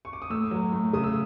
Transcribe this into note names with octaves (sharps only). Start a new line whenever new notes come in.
C#6
D6
D#6
A2 E6
F#3
A2
C#3 D#6
E6